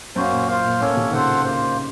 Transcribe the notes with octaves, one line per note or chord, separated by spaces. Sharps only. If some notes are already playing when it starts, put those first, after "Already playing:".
F#2 A#3 C#4 F#4 C5
A#2
F4 C5 F5
A#2
A2 A#3 C#4 A4 C#5
A#2
C3
D#3
C#3 F4 A4 C5 F#5
A#3 F4 C5